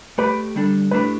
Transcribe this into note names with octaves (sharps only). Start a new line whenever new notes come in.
A3 G4 B4 D5
D3 G3 D4 A4
A2 A3 D4 G4 B4